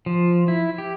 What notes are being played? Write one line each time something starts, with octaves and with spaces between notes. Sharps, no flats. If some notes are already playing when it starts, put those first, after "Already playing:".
F3
E4
G4